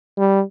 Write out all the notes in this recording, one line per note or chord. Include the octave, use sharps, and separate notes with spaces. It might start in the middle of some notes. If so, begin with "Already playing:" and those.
G3